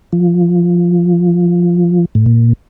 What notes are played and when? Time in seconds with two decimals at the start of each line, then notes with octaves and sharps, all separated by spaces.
0.13 F3
2.15 A2
2.26 A#2